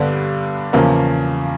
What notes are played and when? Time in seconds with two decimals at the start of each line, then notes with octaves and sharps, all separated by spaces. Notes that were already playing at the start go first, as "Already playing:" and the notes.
Already playing: G2 D3 G3 B3 D4
0.73 E2 C#3 F3 A#3 C#4